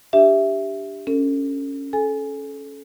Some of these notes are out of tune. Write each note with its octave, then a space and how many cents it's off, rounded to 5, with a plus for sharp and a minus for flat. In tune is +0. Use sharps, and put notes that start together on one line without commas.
D4 +0 G4 +0 E5 +0
C#4 +0 A4 +40
A4 -30 G#5 +0